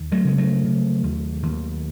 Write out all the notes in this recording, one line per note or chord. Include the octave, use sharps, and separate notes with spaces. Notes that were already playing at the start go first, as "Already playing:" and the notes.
Already playing: D#2
F#3 A3
C#3 G#3
F#3 A3
C#3
D#2
D#2